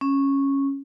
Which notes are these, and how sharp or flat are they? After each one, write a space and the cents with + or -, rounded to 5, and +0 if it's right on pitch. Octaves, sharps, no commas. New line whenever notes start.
C#4 -10